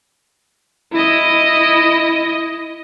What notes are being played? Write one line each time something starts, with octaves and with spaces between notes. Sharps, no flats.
E4 D#5